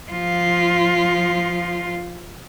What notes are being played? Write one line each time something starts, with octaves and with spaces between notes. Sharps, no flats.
F3 F4